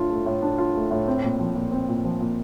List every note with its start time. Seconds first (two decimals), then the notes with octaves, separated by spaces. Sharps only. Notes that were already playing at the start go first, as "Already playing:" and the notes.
Already playing: A2 A3 D4 F4
0.10 A3
0.26 A2
0.42 D4
0.58 F4
0.75 A3
0.91 A2
1.07 C4
1.24 A#2
1.39 F3
1.55 A#2
1.71 C4
1.88 A#2
2.04 F3
2.20 A#2